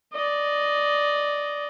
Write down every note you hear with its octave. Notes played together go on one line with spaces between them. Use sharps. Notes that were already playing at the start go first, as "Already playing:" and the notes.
D5 D#5